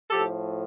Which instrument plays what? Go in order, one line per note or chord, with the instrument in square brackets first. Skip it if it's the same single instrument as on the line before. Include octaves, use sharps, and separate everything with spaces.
[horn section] A2 F3 G4 A4